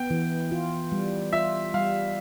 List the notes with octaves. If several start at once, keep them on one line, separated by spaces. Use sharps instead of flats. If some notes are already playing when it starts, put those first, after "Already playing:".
Already playing: B3 G5
E3
F4
G3
F4 E5
G3 F5